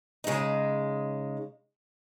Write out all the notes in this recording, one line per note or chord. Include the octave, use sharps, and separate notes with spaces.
C#3 G#3 D#4